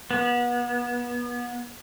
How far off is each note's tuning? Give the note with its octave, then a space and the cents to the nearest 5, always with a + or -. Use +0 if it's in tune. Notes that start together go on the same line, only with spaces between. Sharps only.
B3 -30